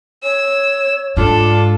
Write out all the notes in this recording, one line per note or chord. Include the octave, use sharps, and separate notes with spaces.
C#5 E6
G#2 D4 F4 A4